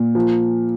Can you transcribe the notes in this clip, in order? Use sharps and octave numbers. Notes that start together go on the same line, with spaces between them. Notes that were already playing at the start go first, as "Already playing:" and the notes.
Already playing: A#2
F3